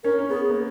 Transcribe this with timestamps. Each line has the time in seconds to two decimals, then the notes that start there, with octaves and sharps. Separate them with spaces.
0.04 C#4 A#4
0.19 C#4
0.29 B3 G#4
0.50 A#3